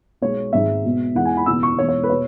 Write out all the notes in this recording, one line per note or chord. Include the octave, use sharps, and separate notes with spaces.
B1 B2 G#3 C#5
G#1 G#2 G#3 E5
B1 B2 G#3
E2 E3 G#3 F#5
G#5
B5
F#1 E2 B2 E6
C#6
E1 E2 E3 G#3 C#5
C#5
B4
B2 C#5